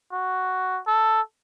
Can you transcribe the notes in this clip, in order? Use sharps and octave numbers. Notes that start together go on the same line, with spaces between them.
F#4
A4